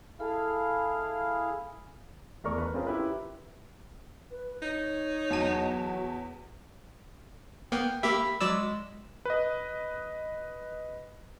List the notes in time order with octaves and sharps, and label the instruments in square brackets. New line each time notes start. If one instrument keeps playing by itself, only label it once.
[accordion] E4 G#4 F5 [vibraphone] A4 A5
[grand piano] E2 A3 A#4 D5 C#6
B4
C4 C#4 F4 G#4 A#4
E4 G4 B4
[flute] B4
[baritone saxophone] D#4 [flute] C#5
[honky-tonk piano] E2 A5 D#7 [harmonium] F#3 F#4
[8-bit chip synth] A#3 B3 [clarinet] G5
[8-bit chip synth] A#3 G4 E5 [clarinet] B5
[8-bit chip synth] F#3 D5 E6 [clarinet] G#3
[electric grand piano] B4 D#5